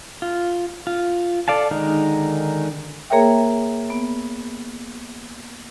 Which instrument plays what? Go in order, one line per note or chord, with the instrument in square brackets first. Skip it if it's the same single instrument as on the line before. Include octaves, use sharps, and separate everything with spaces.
[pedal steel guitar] F4
F4
A4 D5 F5 A5
D3 D#3 G#3 D#4 A#4
[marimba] A#3 G#4 A#4 C#5 E5 G5
B3